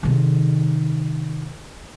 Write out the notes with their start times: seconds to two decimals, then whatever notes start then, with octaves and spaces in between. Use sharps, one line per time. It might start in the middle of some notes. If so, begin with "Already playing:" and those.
0.03 C3 D#3